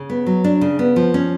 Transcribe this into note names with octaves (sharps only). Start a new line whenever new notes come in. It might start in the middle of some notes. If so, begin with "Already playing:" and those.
Already playing: C#3
B3
F#3
D4
C#3
B3
F3
C#4